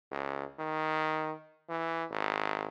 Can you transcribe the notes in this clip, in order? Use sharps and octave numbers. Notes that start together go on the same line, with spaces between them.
C#2
D#3
E3
G#1